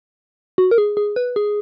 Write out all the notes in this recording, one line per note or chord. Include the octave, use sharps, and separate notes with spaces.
F#4
A#4
G#4
G#4
B4
G#4